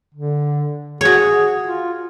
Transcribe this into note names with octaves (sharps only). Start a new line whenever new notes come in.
D3
F#4 G#4 C#5
F4